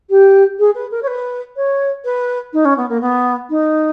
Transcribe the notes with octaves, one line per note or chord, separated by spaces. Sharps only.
G4
G#4
B4
A#4
C#5
B4
C#5
B4
D#4
C#4
B3
A#3
B3
D#4